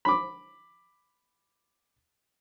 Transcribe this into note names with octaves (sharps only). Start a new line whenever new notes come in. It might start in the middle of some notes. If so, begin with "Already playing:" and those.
B5 D6